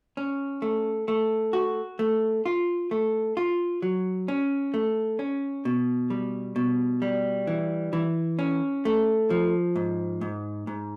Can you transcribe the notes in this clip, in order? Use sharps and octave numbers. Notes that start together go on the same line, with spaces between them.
C#4
A3
A3
F#4
A3
F4
A3
F4
F#3
C#4
A3
C#4
B2
G3
B2
G3
E3
E3
C#4
A3
F3
G#2
G#2
G#2